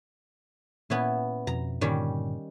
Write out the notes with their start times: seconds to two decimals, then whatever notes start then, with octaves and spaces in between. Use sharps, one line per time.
0.90 A#2 B3 C#4 E4
1.47 F2 B2 A#5
1.81 G2 A#2 D3 D#3 G3 C#4